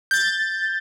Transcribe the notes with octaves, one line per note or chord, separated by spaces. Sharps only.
G6 A6